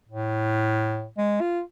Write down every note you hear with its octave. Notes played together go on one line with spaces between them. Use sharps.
A2
G#3
F4